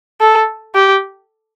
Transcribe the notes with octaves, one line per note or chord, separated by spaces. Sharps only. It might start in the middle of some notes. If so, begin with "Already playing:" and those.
A4
G4